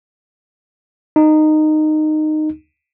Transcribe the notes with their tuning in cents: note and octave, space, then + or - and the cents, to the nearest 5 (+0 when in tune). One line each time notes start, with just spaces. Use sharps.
D#4 -15